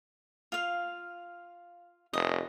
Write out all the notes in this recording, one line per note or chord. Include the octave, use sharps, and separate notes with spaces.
F4 F5
F1 D#5